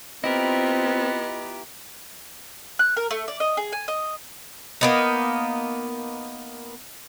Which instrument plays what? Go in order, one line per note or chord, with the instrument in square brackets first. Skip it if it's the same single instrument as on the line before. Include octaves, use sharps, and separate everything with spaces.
[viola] B3 F4 [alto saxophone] C4 [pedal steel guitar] E4 G4 A#4 [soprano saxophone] D#5
[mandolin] F#6
A#4
A3
D5
D#5
G#4
G#5
D#5
[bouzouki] A#3 B3 D#4